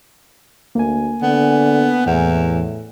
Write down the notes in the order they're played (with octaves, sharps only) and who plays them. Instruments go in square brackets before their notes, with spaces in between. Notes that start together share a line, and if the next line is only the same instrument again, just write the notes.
[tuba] D2 [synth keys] A#3 G#5
[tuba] D3 [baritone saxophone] B3
[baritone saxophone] E2 [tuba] A2